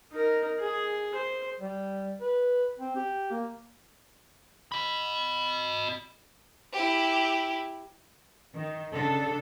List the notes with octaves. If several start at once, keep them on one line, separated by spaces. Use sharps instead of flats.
D#4 A#4
G#4
C5
G3
B4
C4
G4
A#3
D#5 B5
E4 G4
D#3
C#3 D4 A4